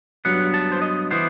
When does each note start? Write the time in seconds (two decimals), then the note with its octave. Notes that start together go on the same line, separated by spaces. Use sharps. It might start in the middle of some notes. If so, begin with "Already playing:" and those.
0.25 G2 F#3 B3 F#5
0.54 A5
0.72 C5
0.82 D#5
1.11 E3 B3 C5